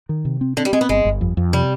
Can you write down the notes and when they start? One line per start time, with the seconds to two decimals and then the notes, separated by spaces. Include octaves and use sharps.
0.09 D#3
0.25 C3
0.41 C4
0.57 D3 C4
0.65 G3
0.73 G#3 C4
0.81 B3
0.89 G1 G#3
1.05 G1
1.21 F2
1.37 F2
1.53 C3 G3